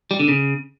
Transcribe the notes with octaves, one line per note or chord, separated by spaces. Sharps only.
G3
D3
C#3